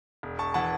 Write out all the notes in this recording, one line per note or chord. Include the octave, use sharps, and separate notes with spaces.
E1
A5 C#6
E3 F#5 A5